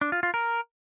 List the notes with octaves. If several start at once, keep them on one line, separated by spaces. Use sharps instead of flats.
D4
F4
F4
A#4